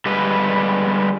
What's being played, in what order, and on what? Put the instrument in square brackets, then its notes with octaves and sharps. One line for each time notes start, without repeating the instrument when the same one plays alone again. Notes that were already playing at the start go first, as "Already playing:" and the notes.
[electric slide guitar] D3 G3 G#3 B4